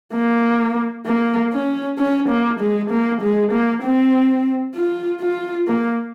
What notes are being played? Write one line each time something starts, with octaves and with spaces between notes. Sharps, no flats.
A#3
A#3
C#4
C#4
A#3
G#3
A#3
G#3
A#3
C4
F4
F4
A#3